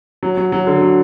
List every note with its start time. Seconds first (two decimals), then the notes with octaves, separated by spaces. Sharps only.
0.23 F#3
0.37 F#3
0.52 F#3
0.67 D3
0.82 F#3